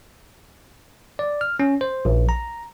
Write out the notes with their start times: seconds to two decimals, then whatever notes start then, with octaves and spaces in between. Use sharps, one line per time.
1.19 D5
1.41 F6
1.60 C#4
1.81 C5
2.05 A#1
2.29 A#5